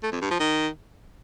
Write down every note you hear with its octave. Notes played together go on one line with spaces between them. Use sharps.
A3
F2
G2
F3
D#3